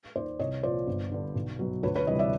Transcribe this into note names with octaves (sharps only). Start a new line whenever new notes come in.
D#2 D#3 C5 D5
C2 C#5 D#5
A#2 F3 C5 D5
G1
G2 D3
B1
B2 F#3
D2 B4 C#5
B4 C#5
C3 E3 G3 C#5 D#5
D5 E5